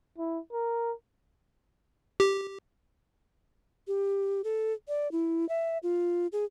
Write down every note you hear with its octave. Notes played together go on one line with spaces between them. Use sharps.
E4
A#4
G4
G4
A4
D5
E4
E5
F4
G#4